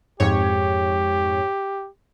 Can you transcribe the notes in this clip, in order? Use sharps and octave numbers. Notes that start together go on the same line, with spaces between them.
F2 G#2 G4 C#5